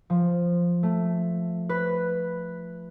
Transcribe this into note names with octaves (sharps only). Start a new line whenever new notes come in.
F3
A3
B4